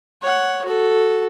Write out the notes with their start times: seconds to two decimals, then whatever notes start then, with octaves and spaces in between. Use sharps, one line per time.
0.22 C#5 F#5
0.65 F#4 A4